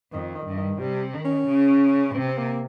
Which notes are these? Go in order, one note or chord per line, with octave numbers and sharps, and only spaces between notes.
F2 D#3
D#3
G2
D#3
C3 G3
D#3
C#4
C#3
C3 C4
C4
A#3